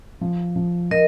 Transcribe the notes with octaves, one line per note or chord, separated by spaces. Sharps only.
F3
F3
F3 A#4 D#5